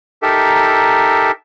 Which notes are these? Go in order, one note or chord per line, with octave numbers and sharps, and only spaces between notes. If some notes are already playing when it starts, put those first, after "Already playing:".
D#4 G4 A4 A#4 E5